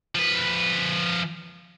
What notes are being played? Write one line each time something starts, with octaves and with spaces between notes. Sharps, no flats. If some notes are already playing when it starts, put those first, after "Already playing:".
F3 B4